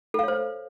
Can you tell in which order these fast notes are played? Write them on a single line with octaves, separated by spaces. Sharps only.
A4 F5 C#5 C5